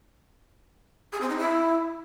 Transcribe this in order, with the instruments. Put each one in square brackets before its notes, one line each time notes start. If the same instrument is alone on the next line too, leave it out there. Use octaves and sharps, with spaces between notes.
[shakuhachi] G#4
C4
D#4
E4